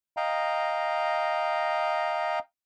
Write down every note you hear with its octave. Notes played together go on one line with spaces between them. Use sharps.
D#5 F5 G5 A#5